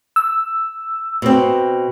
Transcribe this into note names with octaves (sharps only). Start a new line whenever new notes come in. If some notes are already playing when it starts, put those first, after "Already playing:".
E6
B2 C4